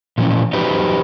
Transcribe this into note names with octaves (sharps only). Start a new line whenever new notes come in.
A#2 E3 F3 C#4
E3 F#3 D#4 G4 B4 C5